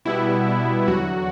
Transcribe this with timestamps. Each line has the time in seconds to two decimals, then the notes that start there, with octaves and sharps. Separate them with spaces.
0.05 B2 G3 B3 E4
0.87 E2 D3 F#3 F#4